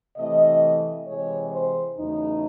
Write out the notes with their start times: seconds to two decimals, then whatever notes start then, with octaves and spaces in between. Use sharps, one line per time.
0.17 C3 E3 A3 D#5
1.06 C3 E3 G#3 C#5
1.51 C5
1.97 E2 C#3 F#3 A3 D#4